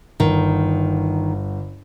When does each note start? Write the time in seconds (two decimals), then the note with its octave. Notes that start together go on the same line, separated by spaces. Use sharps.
0.20 G1 D#3